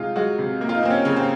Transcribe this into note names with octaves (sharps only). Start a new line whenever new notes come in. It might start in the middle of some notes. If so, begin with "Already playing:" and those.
Already playing: C3 G#3 D#4 F4
G#3 F#4
C3
A#3
F4
D#4
A#3 C4
C#4
C#3 C#4
C4